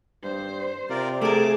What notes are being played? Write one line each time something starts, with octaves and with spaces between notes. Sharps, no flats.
G2 C5
C3 F4 A#4 D5
A3 G#4 A#4 A5 D6